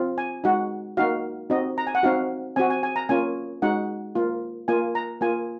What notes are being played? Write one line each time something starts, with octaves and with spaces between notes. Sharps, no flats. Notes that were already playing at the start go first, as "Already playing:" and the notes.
Already playing: C4 F4
G#5
G#3 D#4 F#4 F#5
A#3 D#4 F#4 F5
C4 D#4 F#4 D#5
A#5
G#5
F#5
C4 D#4 F#4 F5
C4 F#4 G#5
G#5
G#5
A#5
A#3 C#4 F4 G#5
G#3 D#4 F#4 F#5
A#3 F4
A#3 F4 G#5
A#5
A#3 F4 G#5